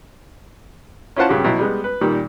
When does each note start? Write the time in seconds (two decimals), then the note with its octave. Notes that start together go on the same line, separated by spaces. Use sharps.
1.16 C#4 E4 F4 C5 F#5 A5
1.29 G2 C#3 C#4 F#4 G4
1.44 B2 F#3 E4
1.59 G3 G#3 B3
1.84 B4
2.01 A#2 D#3 G3